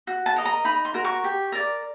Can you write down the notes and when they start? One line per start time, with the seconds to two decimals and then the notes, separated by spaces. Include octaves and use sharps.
0.07 F#4
0.26 A5
0.36 A#4 D#5
0.45 A#5
0.65 D#4 B5
0.85 C6
0.94 F#4 A#4
1.05 C#6
1.24 G4
1.52 A#4 D5